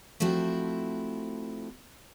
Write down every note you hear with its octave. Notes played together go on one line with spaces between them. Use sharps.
F3 A3 C4 E4 F#4